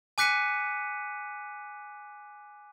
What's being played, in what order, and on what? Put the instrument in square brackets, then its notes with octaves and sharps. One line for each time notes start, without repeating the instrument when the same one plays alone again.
[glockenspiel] G#5 D6 F#6 B6 C#7 D#7